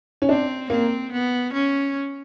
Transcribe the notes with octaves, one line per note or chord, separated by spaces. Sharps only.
C#4
C4 D4
A#3 C4
B3
C#4